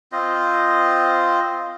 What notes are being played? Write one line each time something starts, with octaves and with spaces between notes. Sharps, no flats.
C4 F4 C5 D#5